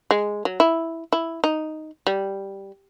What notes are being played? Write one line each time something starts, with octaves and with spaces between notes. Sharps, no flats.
G#3
F#3
E4
E4
D#4
G3